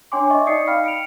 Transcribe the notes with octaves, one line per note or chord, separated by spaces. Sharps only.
D4 C#5 G5 G#5 C6 D6
D#5 E5 C#6
D#4 D5 D#5 D#6 C7 C#7
F5 G5 B5 F6
C#7 D7 F7